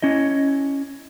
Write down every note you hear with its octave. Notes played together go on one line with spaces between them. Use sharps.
C#4 E4 D#5